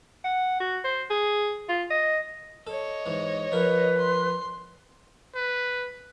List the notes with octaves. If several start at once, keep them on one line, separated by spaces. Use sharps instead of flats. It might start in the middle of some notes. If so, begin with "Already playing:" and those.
F#5
F#4
C5
G#4
F4
D#5
A4 C#5 D#5
G#2 E3
F3 A#4 B4
C6
B4